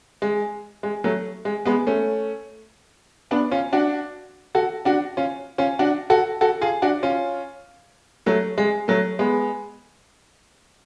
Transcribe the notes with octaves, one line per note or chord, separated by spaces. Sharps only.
G#3
G#3
F#3 A3
G#3
G#3 B3
A3 C#4
B3 D4
C#4 F4
D4 F#4
F#4 A4
D4 F#4
C#4 F4
C#4 F4
D4 F#4
F#4 A4
F#4 A4
F4 G#4
D4 F#4
C#4 F4
F#3 A3
G#3
F#3 A3
G#3 B3